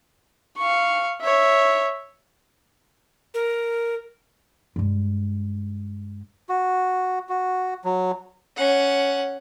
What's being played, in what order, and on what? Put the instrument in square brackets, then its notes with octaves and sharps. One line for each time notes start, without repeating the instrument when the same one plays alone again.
[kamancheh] F5 C#6
C#5 E5
[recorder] A#4
[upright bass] G2 G#3
[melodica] F#4
F#4
F#3
[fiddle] C#4 F#5